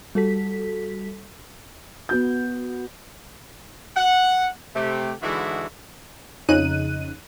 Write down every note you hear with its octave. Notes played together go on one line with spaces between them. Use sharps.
G3 F#4 A4 B6
B3 F#4 G6
F#5
C3 A3 G4
D3 E3 G#3 D#4 E4 F#4
F2 C#3 D#4 F#6 D#7